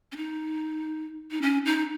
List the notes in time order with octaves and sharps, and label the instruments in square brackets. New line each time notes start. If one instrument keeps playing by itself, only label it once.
[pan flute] C#4
D#4
D#4
C#4
D#4